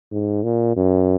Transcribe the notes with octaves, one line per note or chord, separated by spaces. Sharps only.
G#2
A#2
F#2